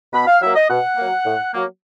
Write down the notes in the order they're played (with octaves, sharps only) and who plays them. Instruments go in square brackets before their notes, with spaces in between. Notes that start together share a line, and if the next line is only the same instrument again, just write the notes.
[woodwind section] B2 B5
F5
F#3 A#3 E5
D#5
B2 F#5
F#3 A#3
A2
F#3 A#3